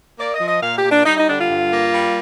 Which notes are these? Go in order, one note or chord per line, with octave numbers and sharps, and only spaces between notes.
A#3 D5
D#5
F3
D#5
A#2 F5
G4
A#2
D4
G3 D#4
D#4
D3 D4
F4
G2
A#3
G3